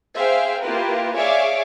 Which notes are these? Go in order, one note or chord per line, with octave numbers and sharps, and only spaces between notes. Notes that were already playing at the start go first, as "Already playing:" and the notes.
G#4 C5 E5 F5 G5
A#3 E4 F4 G4 A#4 B4
G#4 C#5 D5 E5 F5 D6